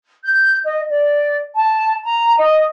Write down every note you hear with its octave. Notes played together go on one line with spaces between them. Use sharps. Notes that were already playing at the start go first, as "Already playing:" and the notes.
G6
D#5
D5
A5
A#5
D#5